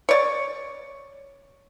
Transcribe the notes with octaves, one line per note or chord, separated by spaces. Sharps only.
C#5 D5